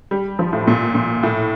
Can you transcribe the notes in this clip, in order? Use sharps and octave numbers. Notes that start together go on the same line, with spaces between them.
G3
F3
A2
A#2
A#2
A2